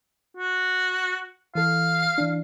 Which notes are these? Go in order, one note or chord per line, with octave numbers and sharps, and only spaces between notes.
F#4
E3 A4 F5
E3 D4